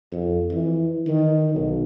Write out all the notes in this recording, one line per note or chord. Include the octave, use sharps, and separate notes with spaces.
F2
E3
D#3
B1